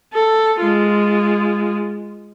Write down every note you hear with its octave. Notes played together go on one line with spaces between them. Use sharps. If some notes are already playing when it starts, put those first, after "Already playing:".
A4
G#3 F4